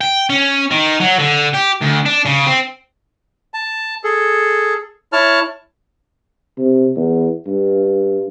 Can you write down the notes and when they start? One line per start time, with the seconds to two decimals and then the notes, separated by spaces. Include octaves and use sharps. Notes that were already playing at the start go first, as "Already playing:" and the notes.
0.01 G5
0.30 C#4
0.71 D#3
1.00 F#3
1.19 D3
1.54 G4
1.82 D2
2.06 D4
2.26 C#3
2.46 C4
3.54 A5
4.04 G#4 A4
5.13 E4 C#5 A5 F6
6.59 C3
6.97 E2
7.47 G2